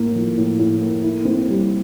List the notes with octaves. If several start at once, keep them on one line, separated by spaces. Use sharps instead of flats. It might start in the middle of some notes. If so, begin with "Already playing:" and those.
Already playing: A2 A#3
F3
A2
A2
A#3
E4
C4
G3